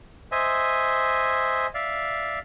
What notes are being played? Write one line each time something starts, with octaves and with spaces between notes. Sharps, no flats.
C5 D#5 E5 G#5
D5 E5 F5